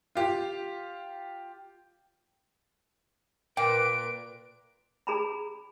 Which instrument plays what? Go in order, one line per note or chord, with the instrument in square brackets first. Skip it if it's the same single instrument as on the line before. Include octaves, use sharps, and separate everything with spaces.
[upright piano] F4 G4
[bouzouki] A#2 [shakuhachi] B4 [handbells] G5 [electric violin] D7
[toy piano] G#4 A#5 B5